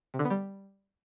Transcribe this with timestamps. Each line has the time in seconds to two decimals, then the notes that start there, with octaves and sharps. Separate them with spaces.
0.14 C3
0.19 D3
0.25 B3
0.30 G3